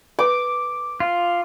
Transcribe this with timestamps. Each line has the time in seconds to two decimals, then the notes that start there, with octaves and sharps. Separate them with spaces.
0.19 B4 D6
1.00 F4